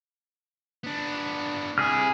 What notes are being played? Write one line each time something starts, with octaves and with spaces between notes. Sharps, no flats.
B3 D4
C2 E4 G#4 F6